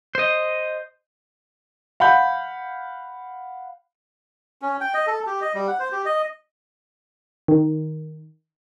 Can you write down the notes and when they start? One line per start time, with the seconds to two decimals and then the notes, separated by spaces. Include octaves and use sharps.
0.15 C5 D#5
2.00 F5 F#5 B5 G6
4.62 C#4
4.81 G5
4.94 D#5
5.07 A4
5.26 G4
5.41 D#5
5.54 G3
5.67 F#5
5.79 C5
5.92 G4
6.06 D#5
7.48 D#3